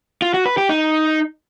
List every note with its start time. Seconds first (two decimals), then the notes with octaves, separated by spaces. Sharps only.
0.22 F4
0.34 F#4
0.46 B4
0.58 G4
0.69 D#4